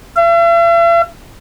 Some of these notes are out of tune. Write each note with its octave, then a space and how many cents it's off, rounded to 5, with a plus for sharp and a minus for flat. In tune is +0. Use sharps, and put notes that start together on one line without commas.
E5 +45